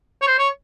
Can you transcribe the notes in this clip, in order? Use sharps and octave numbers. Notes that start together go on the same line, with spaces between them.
C#5
C5
C#5